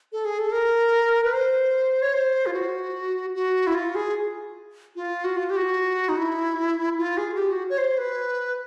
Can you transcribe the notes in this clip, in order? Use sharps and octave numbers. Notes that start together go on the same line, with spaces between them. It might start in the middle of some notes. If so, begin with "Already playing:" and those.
A4
G#4
A4
A#4
B4
C5
C#5
C5
F4
F#4
F#4
E4
F4
G#4
F4
F#4
F4
G4
F#4
D#4
E4
F4
G#4
F#4
G4
F#4
C#5
C5
B4